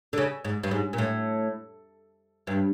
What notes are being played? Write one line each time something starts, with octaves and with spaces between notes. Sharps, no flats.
D3
C#3
G#2
G2
G#2
A#2
A2
G2